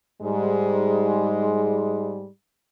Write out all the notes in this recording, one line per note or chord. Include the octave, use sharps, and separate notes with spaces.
G#2 G3 G#3